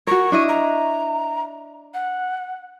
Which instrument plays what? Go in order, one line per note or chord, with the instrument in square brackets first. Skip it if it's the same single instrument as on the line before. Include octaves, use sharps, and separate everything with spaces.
[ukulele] F#4 A#4 [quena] C#6
[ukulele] D4 E4 D#5
[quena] A#5
F#5